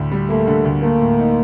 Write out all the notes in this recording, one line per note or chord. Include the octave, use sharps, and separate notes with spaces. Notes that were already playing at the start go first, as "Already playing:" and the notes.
Already playing: D2 A2 D3
G3
A3 A#3
D3
D2
A3 A#3
A2
D#4